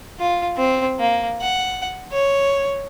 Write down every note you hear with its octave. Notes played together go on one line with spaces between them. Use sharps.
F4
C4
A#3
F#5
C#5